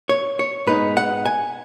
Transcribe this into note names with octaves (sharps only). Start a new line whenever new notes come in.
C#5
C#5
G#2 G#3 B3 D#4 B4
F#5
G#5